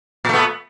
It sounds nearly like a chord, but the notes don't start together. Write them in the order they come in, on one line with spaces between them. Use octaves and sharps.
A#2 A3 B3